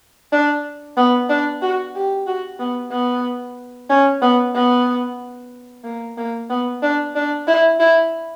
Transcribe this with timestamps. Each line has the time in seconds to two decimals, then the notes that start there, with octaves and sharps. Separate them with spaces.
0.32 D4
0.97 B3
1.29 D4
1.62 F#4
1.95 G4
2.27 F#4
2.59 B3
2.92 B3
3.90 C#4
4.22 B3
4.55 B3
5.84 A#3
6.18 A#3
6.50 B3
6.82 D4
7.15 D4
7.47 E4
7.79 E4